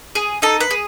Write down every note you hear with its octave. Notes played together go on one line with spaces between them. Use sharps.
G#4
D#4 A4
B4
G#4